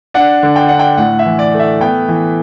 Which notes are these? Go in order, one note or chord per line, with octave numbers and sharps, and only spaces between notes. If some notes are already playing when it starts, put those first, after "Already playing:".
D4 F#5
D3
G5
D4 F#5
G5
A2 F#5
E5
E3
D5
A3
E5
B3 G5
E3